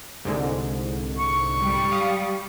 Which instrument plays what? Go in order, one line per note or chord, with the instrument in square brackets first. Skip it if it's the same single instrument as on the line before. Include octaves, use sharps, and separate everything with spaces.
[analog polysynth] C2 G#2 D3
[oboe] C#6
[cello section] G3
[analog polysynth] F5 D#6